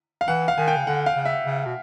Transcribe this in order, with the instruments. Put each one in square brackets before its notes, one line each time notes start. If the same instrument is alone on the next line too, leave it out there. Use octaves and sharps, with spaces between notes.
[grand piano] F5
[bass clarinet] E3 [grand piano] F#5
[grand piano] F5
[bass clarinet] D#3 [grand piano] G#5
[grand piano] G5
[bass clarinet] C#3
[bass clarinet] D3 [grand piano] F#5
[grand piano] F5
[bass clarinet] C#3
[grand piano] E5
[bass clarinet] C#3
B2